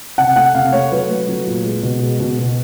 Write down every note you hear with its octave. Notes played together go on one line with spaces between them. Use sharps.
C3 F#5
A3 F#5
C3 F5
A3 C#5
F#3 B4
A3
F#3
A#2
G#3
B2
G#3
B2
B2